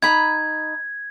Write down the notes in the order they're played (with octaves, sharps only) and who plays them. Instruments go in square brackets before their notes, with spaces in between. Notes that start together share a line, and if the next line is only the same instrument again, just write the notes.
[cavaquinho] D#4 A#5 B5 [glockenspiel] G#6